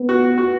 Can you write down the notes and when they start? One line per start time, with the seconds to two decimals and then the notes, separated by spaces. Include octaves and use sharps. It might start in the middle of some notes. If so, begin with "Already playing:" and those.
Already playing: B3
0.09 F#4
0.38 F#4